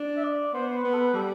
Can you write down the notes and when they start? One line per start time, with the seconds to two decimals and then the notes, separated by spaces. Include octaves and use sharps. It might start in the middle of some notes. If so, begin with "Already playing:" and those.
Already playing: D4
0.17 E5
0.24 D5
0.53 B3 C5
0.67 C5
0.76 B4
0.84 B3
0.94 A4
0.98 B4
1.13 G3 A4